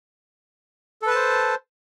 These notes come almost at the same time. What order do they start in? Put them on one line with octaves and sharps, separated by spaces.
A4 B4 A5 C5